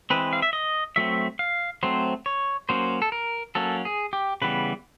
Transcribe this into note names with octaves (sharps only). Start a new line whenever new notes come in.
E3 G#3 C4 B4
F5
E5
D#5
F#3 A3 C4 E5
F5
F#3 A3 C4 C5
C#5
F#3 A#3 C#4 C5
A4
A#4
F#3 A#3 C#4 A4
G#4
G4
C#3 E3 G3 B3 B4